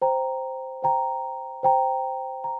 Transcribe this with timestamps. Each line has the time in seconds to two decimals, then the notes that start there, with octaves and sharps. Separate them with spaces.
0.02 C5 G5 A#5
0.83 C5 G5 A#5
1.63 C5 G5 A#5
2.44 A#5